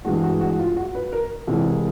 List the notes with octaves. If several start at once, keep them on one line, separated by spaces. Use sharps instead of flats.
G2 E3 G#3 F#4
F#4
F#4
F4
F#4
B4
A#4
C2 C3 E3 G#3